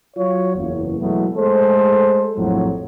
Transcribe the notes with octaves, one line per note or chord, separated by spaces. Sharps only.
F#3 F4 C#5
F#1 E2
B2 E3 F#3 G#3 A3 B3
G#3 A3 A4 C5
A#1 F2 A2 F3 F#3